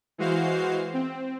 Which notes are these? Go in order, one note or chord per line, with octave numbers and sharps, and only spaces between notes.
E3 G#3 F#4 C5 F5 C7
C4